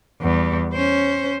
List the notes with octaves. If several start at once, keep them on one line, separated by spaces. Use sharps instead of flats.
E2 G3
C#4 C5